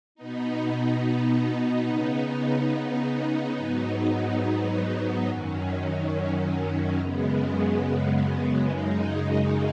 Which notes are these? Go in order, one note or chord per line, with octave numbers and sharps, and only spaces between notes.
B2 B3 D#4
C#3 B3 D#4
G#2 F#3 B3 D#4
F#2 D#3 F#3 C#4
F#2 C#3 G#3 B3
F#2 C#3 G#3 D#4